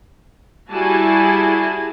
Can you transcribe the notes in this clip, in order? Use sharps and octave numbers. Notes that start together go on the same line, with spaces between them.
G3 E4 F#4 G#4 G#5 A5